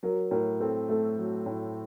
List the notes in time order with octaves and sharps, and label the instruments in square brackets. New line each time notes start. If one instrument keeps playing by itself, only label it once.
[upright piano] F#3 [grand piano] A#4
[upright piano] A2 [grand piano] A#4
[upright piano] C4 [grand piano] A4
[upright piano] A3 [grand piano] A4
[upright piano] F#3
A2